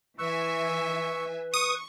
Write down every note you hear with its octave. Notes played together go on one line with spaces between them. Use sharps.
E3 B4 E5 G#5 C#6 E6
C#6 D#6